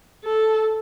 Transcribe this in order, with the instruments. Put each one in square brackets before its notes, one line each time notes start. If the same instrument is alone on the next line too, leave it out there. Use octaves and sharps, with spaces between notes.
[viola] A4